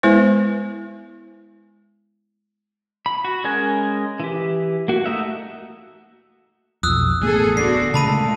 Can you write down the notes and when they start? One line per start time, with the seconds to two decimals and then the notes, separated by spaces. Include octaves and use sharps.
0.03 G#3 B3 E4 B4 C5
3.06 B5
3.25 F#4
3.44 G#3 C#4 A#4 G#5 F#6
4.20 E3 G4
4.88 A#3 F#4
5.04 A3 D#4 E5 F#5
6.83 B1 F2 D#6 E6 F#6
7.21 A1 A3 B3 G#4 A4
7.57 D1 D3 B3 D4 F#4 C7
7.94 A#2 C#3 G#3 A3 A5 B5 D#7